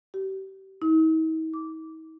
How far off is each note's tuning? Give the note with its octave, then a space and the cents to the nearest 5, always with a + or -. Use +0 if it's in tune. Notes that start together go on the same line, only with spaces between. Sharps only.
G4 -30
D#4 +45
D6 -15